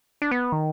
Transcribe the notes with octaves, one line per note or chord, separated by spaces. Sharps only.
D4
B3
D#3